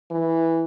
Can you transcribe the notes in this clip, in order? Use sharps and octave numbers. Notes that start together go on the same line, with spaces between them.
E3